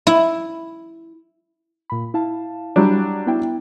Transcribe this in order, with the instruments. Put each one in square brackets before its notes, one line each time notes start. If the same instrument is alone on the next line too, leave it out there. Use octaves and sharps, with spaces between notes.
[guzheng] E4
[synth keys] A#2 B5
E4 F5 A5
[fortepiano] F#3 G3 D4
[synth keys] B3 E4 G5